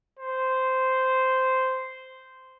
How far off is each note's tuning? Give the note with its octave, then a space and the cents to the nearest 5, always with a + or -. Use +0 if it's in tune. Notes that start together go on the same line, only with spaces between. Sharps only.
C5 -10